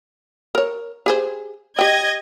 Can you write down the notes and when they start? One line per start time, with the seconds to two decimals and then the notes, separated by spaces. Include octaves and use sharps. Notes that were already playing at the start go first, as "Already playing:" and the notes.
0.55 A#4 C#5
1.06 G4 G#4 C5
1.79 G4 D#5 G5 G#6